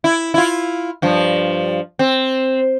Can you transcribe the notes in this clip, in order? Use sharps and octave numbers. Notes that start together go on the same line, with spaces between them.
E4
E4 F4
G2 F3
C4